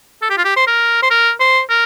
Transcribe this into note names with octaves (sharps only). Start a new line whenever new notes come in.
A4
G4
F4
G4
C5
A#4
C5
A#4
C5
A#4